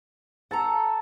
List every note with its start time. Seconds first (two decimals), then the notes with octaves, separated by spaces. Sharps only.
0.51 A4 F#5 A5 A#5